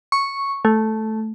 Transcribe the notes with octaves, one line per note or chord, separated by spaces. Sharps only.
C#6
A3